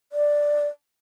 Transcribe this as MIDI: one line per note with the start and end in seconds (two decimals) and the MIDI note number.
0.12 0.66 74